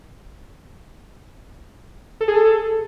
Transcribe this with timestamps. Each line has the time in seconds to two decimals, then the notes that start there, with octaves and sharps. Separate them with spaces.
2.21 A4
2.28 G#4
2.35 A4